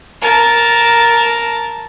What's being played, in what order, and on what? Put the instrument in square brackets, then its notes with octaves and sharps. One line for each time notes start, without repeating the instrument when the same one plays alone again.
[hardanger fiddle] A#4 A5